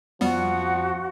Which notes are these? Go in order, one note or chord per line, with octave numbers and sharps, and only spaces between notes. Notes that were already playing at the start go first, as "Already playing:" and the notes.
F2 F3 G3 B3 F#4 F#5